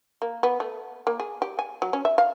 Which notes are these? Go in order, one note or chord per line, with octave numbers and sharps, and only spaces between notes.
A#3
B3
A3
A#3
G#4
G4
G#5
F#3
C#4
E5
F5